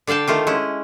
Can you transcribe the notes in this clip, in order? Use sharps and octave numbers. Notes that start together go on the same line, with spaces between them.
D3 D5 F5 G5 A5
D#3 A3 F4 G4
G#3 C#4 E4